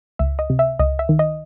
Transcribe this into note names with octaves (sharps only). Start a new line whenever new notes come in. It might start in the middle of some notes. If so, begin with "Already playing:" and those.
C#2 E5
D#5
C3
E5
C#2 D#5
E5
D#3
D#5